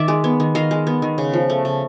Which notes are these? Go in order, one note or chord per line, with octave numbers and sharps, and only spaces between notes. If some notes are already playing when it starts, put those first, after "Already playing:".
Already playing: D#3 D5 E5
G#3
B3
D#3
D#3 D#5 F5
G#3
B3
D#3
C#3
F3
A3
C#3